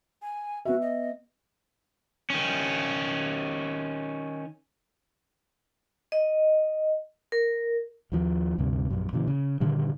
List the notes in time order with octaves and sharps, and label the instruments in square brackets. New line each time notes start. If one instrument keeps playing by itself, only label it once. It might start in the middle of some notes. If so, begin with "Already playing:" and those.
[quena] G#5
[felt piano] B3 E5 [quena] F#4
[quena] D#5
[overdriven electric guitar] D#3 C#4
[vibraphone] D#5
A#4
[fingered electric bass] D#2 D#3 F3
D2 G2 C3
A#1 F#2
A#2 C#3 E3
C#3
G2 A#2 D3 D#3